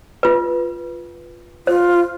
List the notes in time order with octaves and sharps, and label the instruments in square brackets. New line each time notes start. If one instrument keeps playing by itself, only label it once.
[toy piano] F4 B4
[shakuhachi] F4 [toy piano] C5